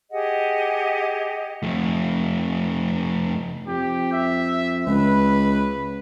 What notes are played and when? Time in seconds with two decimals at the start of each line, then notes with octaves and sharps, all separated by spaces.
0.10 G4 G#4 D#5 F#5
1.63 F2 A3
3.67 F2 G4
4.13 E5
4.87 C#2 B4